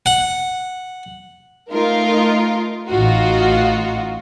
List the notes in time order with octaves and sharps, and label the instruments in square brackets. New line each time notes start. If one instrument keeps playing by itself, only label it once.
[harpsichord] F#5
[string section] A3 D#4 F4 A#4
A1 D#4 F4 F#4